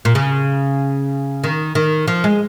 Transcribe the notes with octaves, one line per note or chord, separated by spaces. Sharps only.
A#2
C#3
D#3
D#3
F3
G#3